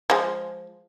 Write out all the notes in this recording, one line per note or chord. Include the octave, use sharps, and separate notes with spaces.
F3 G#3